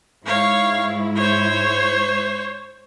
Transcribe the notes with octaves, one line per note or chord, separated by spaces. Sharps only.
G#2 E4 C#5 F5
C5 C#5